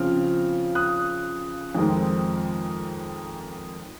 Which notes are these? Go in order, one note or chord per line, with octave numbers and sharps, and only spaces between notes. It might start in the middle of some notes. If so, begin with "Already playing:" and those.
Already playing: C#3 F3 C4 F6
D#6 F#6
F2 D#3 G#3 C4